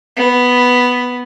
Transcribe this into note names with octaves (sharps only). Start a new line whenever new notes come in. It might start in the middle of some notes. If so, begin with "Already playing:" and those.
B3